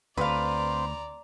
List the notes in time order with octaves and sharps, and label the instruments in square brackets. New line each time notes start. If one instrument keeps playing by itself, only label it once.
[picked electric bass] D2 [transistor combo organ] C4 [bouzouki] B4 F5 [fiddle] D5 A#5